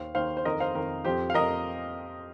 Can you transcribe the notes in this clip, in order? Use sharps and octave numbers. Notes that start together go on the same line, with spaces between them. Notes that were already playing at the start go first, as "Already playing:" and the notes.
Already playing: D#2 D#3 C5 F5
D#2 D#3 C5 F5
C5
F2 D#3 A#4 D#5
C5 F5
F2 D#3 A#4
F2 F3 G4 C5
F5
F2 F3 A#4 D#5